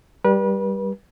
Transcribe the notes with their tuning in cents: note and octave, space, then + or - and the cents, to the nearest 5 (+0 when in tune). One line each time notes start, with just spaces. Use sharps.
G3 +0 B4 -35